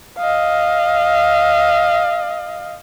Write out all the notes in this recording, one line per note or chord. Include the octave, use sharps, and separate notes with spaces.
D#5 F5